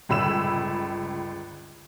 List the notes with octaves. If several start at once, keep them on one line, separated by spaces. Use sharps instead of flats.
G1 C#2 B5 E6 E7